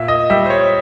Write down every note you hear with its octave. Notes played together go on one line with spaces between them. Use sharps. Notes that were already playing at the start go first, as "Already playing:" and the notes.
Already playing: A#2 E5
D#5
G3 E5
C5
C#5